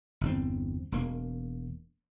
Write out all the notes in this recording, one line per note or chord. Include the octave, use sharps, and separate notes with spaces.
G1 E2 C4
E1 A#3